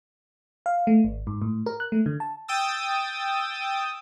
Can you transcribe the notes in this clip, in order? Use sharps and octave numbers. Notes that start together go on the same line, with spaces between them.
F5
A3
G#1
G#2
A2
A#4
F#6
A3
D3
A5
G5 D#6 E6 A6